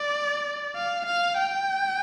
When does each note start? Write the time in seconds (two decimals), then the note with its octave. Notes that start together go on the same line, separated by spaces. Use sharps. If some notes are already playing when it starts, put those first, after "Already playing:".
Already playing: D5
0.76 F5
1.06 F5
1.38 G5